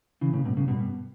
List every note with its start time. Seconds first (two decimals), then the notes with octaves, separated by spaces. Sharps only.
0.21 C#3 E3
0.33 A2 C#3
0.45 G2 B2
0.57 A2 C#3
0.68 G2 B2
0.80 G2